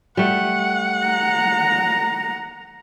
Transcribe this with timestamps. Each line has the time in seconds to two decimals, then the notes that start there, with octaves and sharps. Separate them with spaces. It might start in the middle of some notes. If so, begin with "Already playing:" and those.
0.17 G3 A3 F#5
1.06 A#5